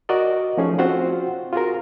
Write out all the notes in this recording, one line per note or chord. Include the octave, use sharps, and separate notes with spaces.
F#4 A#4 D5 D#5
F3 A3 C#4 D#4 G#4
C4 F4 F#4 C5 F#5 C6
F4 F#4 G#4 A#4